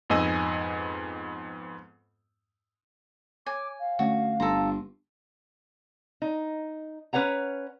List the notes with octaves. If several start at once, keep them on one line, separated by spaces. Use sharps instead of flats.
F2 G#2 B3 D#5 G#5 E6
C#5 G#5 D6
F5
D3 A3 C#4 F#4
G1 A4 A#5 C6
D#4
C#4 B4 C#5 F#5 A#5